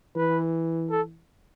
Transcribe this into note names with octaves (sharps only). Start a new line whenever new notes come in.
E3 B4
A4